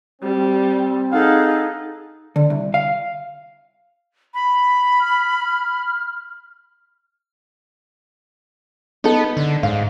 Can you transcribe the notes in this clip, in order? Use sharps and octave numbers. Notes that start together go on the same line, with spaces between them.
G3 C4
D#4 G#4 A4 F5 F#5
D3
C2
F5
B5
F6
B3 D#4 A4
D3
G#2 F5